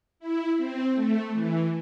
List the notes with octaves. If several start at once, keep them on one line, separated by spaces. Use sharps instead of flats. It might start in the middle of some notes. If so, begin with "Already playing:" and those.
E4
C4
A3
E3